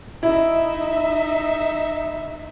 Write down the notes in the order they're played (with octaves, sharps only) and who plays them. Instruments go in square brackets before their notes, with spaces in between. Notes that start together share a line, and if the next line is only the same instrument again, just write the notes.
[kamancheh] D#4 E5 [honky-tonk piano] E4